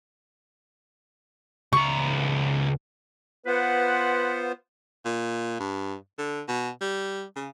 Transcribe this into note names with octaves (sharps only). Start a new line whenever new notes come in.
C#2 A#5 C#6
B3 F4 B4 C5 F#5
A#2
G2
D3
B2
G3
C#3